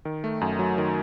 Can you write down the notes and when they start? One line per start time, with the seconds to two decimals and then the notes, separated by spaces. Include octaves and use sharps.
0.05 D#3
0.24 A3
0.41 F#2
0.59 F#3
0.78 D#3